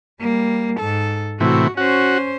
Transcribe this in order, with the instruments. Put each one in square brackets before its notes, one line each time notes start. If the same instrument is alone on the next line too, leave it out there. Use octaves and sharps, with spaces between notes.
[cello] G3 A#3
G#2 A4
[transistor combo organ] A2 C3 E3 [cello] F#4
[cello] C#4 C5 [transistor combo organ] F#4